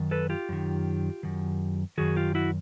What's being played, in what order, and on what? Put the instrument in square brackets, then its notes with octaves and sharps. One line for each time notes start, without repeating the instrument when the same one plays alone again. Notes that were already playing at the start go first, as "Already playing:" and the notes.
Already playing: [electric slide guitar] F#2 D#3
A4 B4
F4 G4
F#2 D#3
F#2 D#3
F#2 D#3 F#4 G#4
F4 G4
E4 F#4